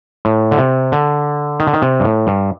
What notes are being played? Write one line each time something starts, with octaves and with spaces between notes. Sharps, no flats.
A2
D3
C3
D3
D#3
D3
D#3
C3
G2
A2
G2